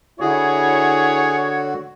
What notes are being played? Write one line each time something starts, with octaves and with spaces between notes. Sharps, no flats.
D3 E4 F#4 G#4 C#5